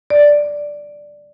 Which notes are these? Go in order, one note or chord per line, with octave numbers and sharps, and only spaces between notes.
D5